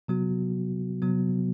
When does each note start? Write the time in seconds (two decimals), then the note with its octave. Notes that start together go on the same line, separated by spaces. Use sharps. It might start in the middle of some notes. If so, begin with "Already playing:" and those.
0.08 C3 F#3 B3 F#4
1.02 C3 F#3 B3 F#4